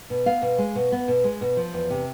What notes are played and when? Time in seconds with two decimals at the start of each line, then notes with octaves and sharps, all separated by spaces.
0.10 B2
0.26 B3 F5
0.42 B2
0.58 G#3
0.75 B2
0.92 B3
1.08 B2
1.24 G#3
1.41 B2
1.57 F3
1.74 E2
1.90 C3